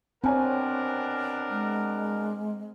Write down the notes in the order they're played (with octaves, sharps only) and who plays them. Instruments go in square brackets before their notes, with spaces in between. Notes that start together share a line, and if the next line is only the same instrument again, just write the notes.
[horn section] B2 D4 A#4 [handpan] C4 [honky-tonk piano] C#5 G#5 A#5
[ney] G#3